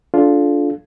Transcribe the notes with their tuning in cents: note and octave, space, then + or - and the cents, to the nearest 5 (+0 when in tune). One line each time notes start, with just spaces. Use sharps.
D4 -15 F4 +0 A4 -25